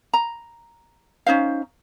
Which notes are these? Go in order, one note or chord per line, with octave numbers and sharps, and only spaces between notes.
A#5
C#4 D#4 C5 F5